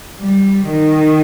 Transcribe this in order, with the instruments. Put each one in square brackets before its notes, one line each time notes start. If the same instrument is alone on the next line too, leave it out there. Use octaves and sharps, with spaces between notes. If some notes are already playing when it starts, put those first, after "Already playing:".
[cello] G3
D#3